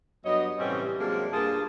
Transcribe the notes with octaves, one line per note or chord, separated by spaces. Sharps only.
G2 F#3 B3 C#5 D#5
A2 C3 E3 G3 C4 C#4
C3 F#3 G#3 A#3 D4
G2 A#3 F4 G#4 A5